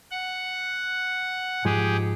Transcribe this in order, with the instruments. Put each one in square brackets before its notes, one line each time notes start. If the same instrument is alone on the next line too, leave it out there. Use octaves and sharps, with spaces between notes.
[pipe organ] F#5
[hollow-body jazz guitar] G#2 F3 G#3 [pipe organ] G4 G#4